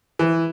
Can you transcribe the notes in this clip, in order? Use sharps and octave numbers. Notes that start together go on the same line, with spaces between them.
E3